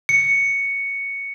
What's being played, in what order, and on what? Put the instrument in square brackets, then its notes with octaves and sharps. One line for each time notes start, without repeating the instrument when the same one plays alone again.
[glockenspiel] C#7